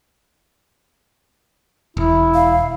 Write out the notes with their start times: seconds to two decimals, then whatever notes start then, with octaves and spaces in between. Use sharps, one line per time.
1.97 E1 E4
2.34 F5